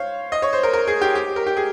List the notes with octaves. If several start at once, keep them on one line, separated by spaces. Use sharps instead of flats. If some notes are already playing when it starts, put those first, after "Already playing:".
Already playing: C5 C#5 F5
D#5
C#5
C5
A#4
A#4
G#4
G4
G4
A#4
G4
G#4